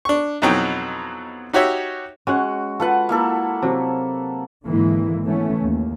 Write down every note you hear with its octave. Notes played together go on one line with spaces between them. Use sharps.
D4 C#6
F2 B2 E3 F#3 D#4 G5
D#4 F#4 G4 C#5 E5
G#3 C#4 F#4 F#5
F4 A4 B4 F#5
A#3 E4 A4
C3 F#3
G#1 D3 E3 G#3 A#3
E3 A3 B3 C#4
D#2